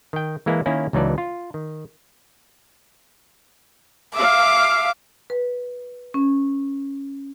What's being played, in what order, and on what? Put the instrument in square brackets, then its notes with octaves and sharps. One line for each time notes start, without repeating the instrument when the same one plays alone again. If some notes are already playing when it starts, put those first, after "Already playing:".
[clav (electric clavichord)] D#3 G5
E3 G#3 A#3 E4
D#3 A#3 C#4 E4
C#2 E3 F#3 D#4 D5 A5
F4
D#3
[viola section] E5 F5 [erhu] D6
[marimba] B4
C#4